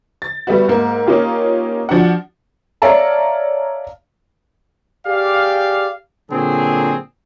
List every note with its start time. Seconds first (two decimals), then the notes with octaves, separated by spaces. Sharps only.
0.22 A6
0.47 G3 A3 B3 F#4
0.68 G#2 A#3
1.07 A#3 C#4 D#4 F4 G4
1.89 F3 D4 F#4 F#5
2.82 C#5 D5 E5 F5 A5 A#5
5.05 G4 G#4 D5 F5
6.30 A#2 D3 F#3 C4 G#4